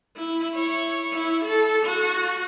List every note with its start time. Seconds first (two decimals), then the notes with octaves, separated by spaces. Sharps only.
0.16 E4
0.55 E4 C#5
1.13 E4
1.44 A4
1.86 F#4